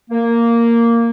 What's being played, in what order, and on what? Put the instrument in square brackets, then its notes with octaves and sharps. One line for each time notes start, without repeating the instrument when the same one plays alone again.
[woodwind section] A#3